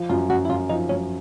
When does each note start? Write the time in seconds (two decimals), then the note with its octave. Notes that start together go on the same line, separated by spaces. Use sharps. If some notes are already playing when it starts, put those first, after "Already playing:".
Already playing: F3
0.09 F#2 F4
0.29 F#2 F#4
0.45 E4
0.49 F#2 F4
0.69 F3 D#4
0.89 F#2 C#4